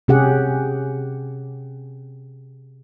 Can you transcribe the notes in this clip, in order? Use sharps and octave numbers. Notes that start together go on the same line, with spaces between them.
C3 C#4 G4 G#4 F#5